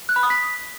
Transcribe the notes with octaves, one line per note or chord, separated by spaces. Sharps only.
F#6
B5
D#6
B6